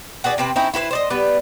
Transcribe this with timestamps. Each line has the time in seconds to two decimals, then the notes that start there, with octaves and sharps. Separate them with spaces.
0.24 F#4 G#4 B4 D5
0.38 C3 C4 B4
0.56 C4 C#4 D#4 E4
0.74 E4 F#4 B4 C5
0.91 C5 D5 D#5
1.10 G3 B3 B4